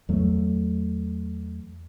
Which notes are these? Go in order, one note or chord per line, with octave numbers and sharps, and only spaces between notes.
E2 F#3 A3